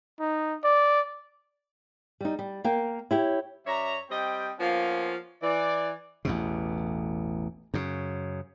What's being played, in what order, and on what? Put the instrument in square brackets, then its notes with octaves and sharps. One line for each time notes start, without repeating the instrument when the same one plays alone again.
[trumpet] D#4
D5
[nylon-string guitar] G3 D#4
G3
A#3 F5 G5
E4 G4 C#5
[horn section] F#2 C#5 D5 E5 A#5
G3 C4 D#5 G5
F3 A#3 B3 C#4 F4
E3 D5
[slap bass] A1 E2 B2
F#2 C#3